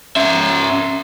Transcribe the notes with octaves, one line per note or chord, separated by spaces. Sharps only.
C#4 E5